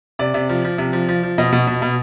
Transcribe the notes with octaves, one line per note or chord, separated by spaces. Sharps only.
C3 D5
C3
F3
F3
C3
F3
F3
F3
B2 D#5
B2
B2
B2